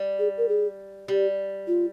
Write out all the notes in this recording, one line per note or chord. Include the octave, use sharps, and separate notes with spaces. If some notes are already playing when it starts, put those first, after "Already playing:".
Already playing: G3
G#4
A#4
G#4
G3 G4
F4